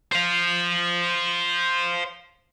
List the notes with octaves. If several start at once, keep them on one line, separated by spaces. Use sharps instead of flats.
C5 F5